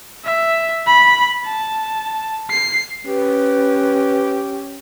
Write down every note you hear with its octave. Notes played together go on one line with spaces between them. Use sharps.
E5
B5
A5
C7
C#4 G4 B4